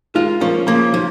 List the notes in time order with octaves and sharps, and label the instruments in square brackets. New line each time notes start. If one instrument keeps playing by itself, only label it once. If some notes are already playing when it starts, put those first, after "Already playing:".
[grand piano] D#3 G#3 [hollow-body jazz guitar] F4
[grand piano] F3 A#3 [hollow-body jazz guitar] C#4
[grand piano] C#3 F3 [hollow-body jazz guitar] A#3
[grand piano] D#3 [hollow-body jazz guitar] F3